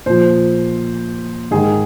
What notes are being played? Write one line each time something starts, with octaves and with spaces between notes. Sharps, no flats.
A#2 F3 C5
G#2 D#3 G#4